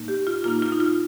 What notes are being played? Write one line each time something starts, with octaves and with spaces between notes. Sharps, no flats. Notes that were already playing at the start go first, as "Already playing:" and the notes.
Already playing: A#2 A#3 D#4
G4
F4
A#2 A#3 D#4 F4
F4
D#4
F4